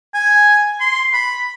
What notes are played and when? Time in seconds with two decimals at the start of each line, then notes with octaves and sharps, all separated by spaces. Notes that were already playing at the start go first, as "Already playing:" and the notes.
0.14 G#5
0.80 C6
1.13 B5